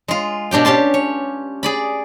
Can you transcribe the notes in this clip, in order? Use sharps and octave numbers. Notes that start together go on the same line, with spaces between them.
G#3 F4
B2 D4 G4 G5
C#4 G4 A5 C6
C#5
G#4 D5 B5